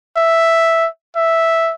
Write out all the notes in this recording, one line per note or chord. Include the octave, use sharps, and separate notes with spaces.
E5
E5